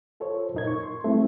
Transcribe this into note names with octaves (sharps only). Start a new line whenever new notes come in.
F4 A4 C5 C#5
F#2 A#2 D#4 A#4 G#6
C#6
C6
F#3 G3 A3 C4 E4